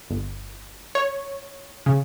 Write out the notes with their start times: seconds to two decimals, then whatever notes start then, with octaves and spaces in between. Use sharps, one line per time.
0.10 G1
0.95 C#5
1.86 C#3